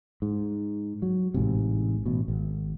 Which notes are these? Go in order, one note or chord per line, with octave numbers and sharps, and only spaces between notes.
G#2
F#3
A1 G#2 C3
A1 B2
G#1